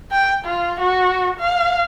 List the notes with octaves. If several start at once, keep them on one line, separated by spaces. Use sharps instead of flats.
G5
F4
F#4
F5